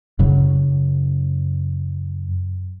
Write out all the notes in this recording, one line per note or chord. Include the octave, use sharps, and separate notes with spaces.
F#2 C#3 F#3